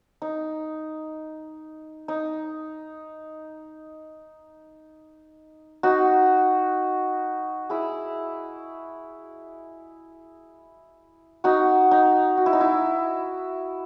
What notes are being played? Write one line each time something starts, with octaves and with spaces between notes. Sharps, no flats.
D#4
D#4
D#4 F#4
E4 G#4
D#4 F#4
D#4
F#4
E4
D#4
E4